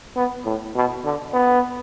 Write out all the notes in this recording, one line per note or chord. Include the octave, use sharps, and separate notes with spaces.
B3
A2
B2
D3
B3